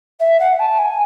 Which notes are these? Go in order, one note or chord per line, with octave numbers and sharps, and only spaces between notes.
E5
F#5
A5
G#5